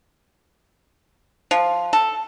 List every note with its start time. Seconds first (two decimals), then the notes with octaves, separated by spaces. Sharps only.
1.51 F3
1.93 A4